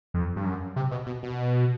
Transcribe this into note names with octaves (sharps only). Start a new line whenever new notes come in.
F2
G2
F#2
C3
B2
B2
B2